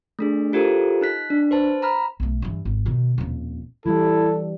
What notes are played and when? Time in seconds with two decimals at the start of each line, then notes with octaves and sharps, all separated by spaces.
0.19 A3 D4 G#4
0.52 E4 F4 G4 A4 A#4 C5
1.01 D#4 F#6 B6
1.30 D4
1.51 B4 C5 A5
1.82 A#5 B5 F6
2.20 B1 A3
2.42 G2 E3
2.65 G#1
2.86 B2 D#3
3.18 D#1 F2
3.86 E3 G3 E4 A4